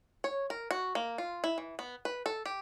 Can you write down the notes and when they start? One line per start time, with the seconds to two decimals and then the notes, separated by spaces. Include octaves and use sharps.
0.24 C#5
0.50 A#4
0.71 F#4
0.95 A#3
1.18 F4
1.44 E4
1.58 E3
1.79 B3
2.05 B4
2.26 A4
2.46 G4